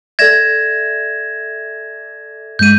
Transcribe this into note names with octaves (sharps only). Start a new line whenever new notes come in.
A4 D5 E5 G#6 A#6 E7
G2 G#3 G6 D#7